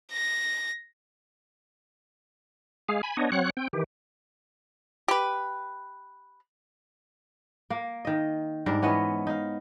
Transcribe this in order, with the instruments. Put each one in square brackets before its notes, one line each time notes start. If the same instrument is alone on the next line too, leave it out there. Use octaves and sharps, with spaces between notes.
[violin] A#6
[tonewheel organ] G#3 G#4 F5
G#5 B5
B3 D4 C#5 D#5
F#3 C4 C#5 F#5 F#6
C4 G5
D#3 E3 G4
[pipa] G4 B4
[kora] A#3
D#3 D#5
G#2 G3 D4 A#4
E3 B3 C#4 D#5
D#4 F5